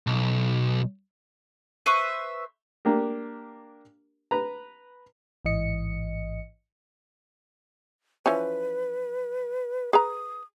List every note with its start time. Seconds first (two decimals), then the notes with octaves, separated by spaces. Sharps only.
0.07 B1
1.86 B4 C5 E5 C#6
2.85 A#3 D4 G4 A#4
4.31 B4 A#5
5.45 A1 G#2 E3 D#5 C#7
8.26 E3 F3 C#4 B4
9.93 G#4 B4 A#5 D#6